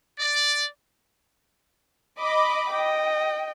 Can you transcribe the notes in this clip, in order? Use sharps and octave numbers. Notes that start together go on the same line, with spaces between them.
D5
D#5 B5 D6
D#5 G5